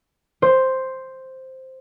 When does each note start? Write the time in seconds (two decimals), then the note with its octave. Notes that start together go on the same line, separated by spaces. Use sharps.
0.42 C5